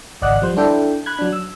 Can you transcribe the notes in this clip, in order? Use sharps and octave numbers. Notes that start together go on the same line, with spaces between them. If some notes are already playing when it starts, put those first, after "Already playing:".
G#1 C#2 D5 D#5 F#5 F#6
F3 G3 C5
D4 E4 A4 G5
B5 F#6 G#6
F#3 D4
E6